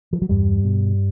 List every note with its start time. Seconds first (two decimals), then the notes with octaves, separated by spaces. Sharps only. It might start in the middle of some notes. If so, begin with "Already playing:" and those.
0.13 F3
0.22 F#3
0.29 E2 G2 G3
0.64 B2